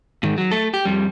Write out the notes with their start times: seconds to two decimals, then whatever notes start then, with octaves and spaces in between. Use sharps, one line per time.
0.23 G#2 D#3
0.38 F#3
0.51 A3 A4
0.74 G4
0.85 F2 G3